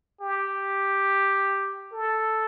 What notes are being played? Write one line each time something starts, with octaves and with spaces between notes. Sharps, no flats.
G4
A4